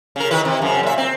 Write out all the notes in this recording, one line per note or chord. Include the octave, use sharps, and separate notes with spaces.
C#3 A#4
D#3 E4 B4
C3
F#2 C#3
A#2 E5
C4